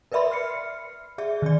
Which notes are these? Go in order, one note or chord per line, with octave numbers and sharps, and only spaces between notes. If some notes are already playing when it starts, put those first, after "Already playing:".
A#4 B4 D5 E5 B5 C6
F6 C7 C#7
G#4 D5 E5
D#3 D5